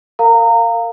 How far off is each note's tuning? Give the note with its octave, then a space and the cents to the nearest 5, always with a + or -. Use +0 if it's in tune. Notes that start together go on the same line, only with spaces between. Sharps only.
A#4 -25 F5 +0 A#5 -25